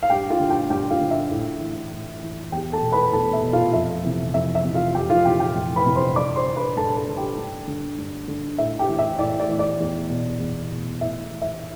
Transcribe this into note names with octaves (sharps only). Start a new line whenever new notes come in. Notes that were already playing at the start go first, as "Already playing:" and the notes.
F5
G2 G4 G5
F4 F5
D3
G4 G5
G2 G4 G5
F4 F5
D3
E5
A2
E3
A2
E3
E2 G4 G5
A4 A5
B2
B4 B5
E2 A4 A5
E5
B2
F4 F5
F2 E5
C3 E3
F2 E5
E5
C3 E3
F4 F5
F2 G4 G5
F4 F5
C3 E3 G4 G5
G4 G5
F2
B4 B5
C3 E3
C5 C6
G2 D5 D6
C5 C6
D3
B4 B5
G2 A4 A5
A4 A5
D3
G4 G5
G2
D3
G2
D3
A2 E5
G4 G5
E3
E5
A2 D5
D5
E3
D5
E2
B2
E2
B2
A2 E5
E3
E5